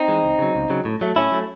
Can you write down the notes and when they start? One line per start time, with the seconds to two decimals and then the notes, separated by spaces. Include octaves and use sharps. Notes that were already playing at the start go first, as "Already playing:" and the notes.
Already playing: C4 D#4
0.08 E3 G#3
0.23 C#2
0.39 C#3 F#3
0.55 C#2
0.70 C#3 F#3
0.85 A2
1.01 F#3 A3
1.16 A2 C#4 E4
1.32 F#3 A3